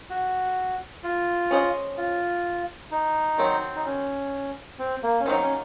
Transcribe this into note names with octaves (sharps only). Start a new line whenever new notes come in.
F#4
F4
C#4 G#4 C5 D#5
F4
D#4
D#3 F#3 C4
D#4
C#4
C4
A#3
C#4
D#3 F#3 A#3 C4 D#4
C#4